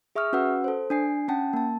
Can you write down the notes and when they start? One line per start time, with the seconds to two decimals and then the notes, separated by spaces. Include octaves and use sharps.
0.15 G#4 E5 C#6 D#6 F6
0.33 C#4 F#4 B4 F#5 E6
0.64 A4 C5
0.90 D4 G#5 C7
1.28 C#4 F#5 G5 A5
1.53 A#3 A5